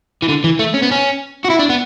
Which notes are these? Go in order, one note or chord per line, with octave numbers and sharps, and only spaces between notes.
E3
D3
E3
A3
C#4
B3
C#4
F#4
E4
D4
B3